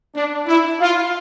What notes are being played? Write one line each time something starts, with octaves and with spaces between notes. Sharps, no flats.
D4
E4
F4